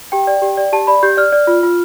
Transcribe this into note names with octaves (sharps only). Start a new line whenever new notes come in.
G4 G5
D5
G4
D5
G4 A5
D5 B5
G4 G6
D5 F6
D5
F4
F4